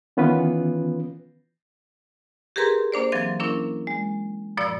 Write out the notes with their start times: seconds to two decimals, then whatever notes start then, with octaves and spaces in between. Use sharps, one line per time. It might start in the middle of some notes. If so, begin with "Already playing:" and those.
0.17 D#3 E3 B3 C#4 F4 B4
2.56 G4 G#4 A#4 B4 A#5 C6
2.92 A#3 D4 C5 D5
3.12 E3 F#3 C4 F5 A6
3.40 A#3 C#4 D4 E4 A#4
3.87 G#3
4.57 F#2 A#2 F3 D5 B5 E6